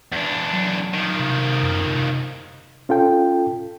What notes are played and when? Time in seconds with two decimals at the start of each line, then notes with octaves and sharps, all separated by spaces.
0.12 E2 D4
0.53 F#3
0.94 D#3 F3
1.19 C3
1.63 F#2
1.86 C3
2.89 C#4 F4 A4 G5